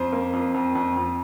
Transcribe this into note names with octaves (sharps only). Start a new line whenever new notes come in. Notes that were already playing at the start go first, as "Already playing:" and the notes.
Already playing: F2 C5
A#3
F2
F2
F2
F2